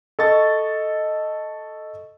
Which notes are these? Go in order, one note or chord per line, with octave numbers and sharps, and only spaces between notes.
A4 D#5 C#6 A6